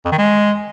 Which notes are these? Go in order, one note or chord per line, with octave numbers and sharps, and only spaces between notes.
F2
D#3
G#3